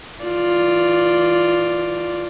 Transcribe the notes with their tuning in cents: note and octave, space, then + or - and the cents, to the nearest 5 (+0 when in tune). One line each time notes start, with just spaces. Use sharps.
E3 -20 F4 +0 D5 +0